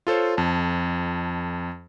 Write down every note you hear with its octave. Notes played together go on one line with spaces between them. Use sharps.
F4 A4 C5 C#5
F2 A5